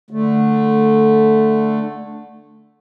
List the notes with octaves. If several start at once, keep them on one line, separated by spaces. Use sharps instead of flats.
D3 A3